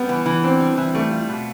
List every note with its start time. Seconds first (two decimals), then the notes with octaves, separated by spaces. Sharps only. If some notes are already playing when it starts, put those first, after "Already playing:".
Already playing: G3 B3
0.09 E3
0.26 E3
0.43 C4 D4
0.60 G3
0.77 E3
0.94 G3 A3
1.11 F4
1.29 B2